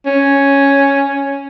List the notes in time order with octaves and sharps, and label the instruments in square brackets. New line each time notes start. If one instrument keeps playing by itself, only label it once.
[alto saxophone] C#4